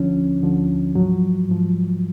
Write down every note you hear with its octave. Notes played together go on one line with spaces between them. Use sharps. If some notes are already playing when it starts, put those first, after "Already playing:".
Already playing: D2 D3 F3 C#4
D2 D3 F3
G#2 F3 F#3
G#2 F3